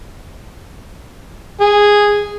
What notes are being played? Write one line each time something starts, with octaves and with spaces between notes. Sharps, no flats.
G#4